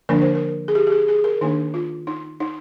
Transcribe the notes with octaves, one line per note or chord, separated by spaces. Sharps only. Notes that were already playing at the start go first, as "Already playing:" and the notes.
D3 F3 A#3 D4 A#4
C5
A#4
G#4
G4
G4
G#4
G#4
A#4
D#3 A#3 D4 D#4
F4
D#4
D#4